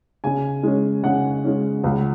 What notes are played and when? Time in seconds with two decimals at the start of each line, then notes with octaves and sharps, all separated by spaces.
0.24 C#3 G#5
0.63 G#3 C#4
1.03 C#3 F#5
1.44 G#3 C#4
1.84 C#2